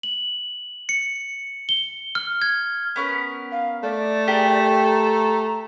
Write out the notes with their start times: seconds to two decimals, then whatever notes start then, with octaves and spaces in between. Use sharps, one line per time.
0.03 F#7
0.89 C#7
1.69 G7
2.15 F6
2.42 G#6
2.96 B3 C#4 A#4
3.52 F5
3.83 A3 D5
4.28 G4 G#4 A#4
4.87 A#5